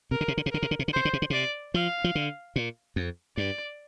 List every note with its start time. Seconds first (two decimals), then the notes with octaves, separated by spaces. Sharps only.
0.11 C3 A#4
0.21 D3
0.28 C3
0.37 D3
0.46 C3
0.52 D3 A#4
0.62 C3
0.71 D3
0.79 C3
0.88 D3
0.94 C3 C5
1.05 D3
1.13 C3
1.22 D3
1.30 C3 D5
1.74 F3 F5
2.04 F3
2.15 D3
2.56 A#2
2.96 F2
3.37 G2 D5